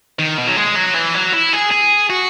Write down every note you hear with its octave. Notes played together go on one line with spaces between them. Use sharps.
D#3
B2
F#3
G#3
F#3
E3
F#3
E4
G#4
G#4
F#4